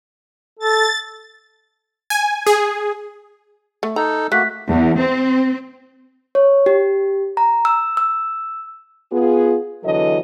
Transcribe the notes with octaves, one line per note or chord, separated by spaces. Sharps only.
A4 A6
G#5
G#4
A3
D#4 A4 A#5
A3 A#3 F#4 F#6 B6
E2
C4
C#5
G4
A#5
E6
E6
B3 F4 G#4
E2 D3 E3 F#3 A4 D#5